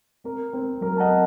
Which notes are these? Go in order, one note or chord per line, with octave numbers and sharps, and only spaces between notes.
C4 A#4
C4
F#3 A#4
A5
D#5 F#5
C4